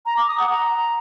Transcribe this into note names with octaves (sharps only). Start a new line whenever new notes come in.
A#5
D6
D#6
F#5
A#5